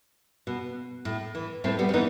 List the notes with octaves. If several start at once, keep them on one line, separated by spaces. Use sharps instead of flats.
B2
A2
E3
A2 A3 C4
G3 B3
C4
E3 B3 D#4